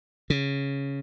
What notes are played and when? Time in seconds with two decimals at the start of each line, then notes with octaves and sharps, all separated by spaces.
0.30 C#3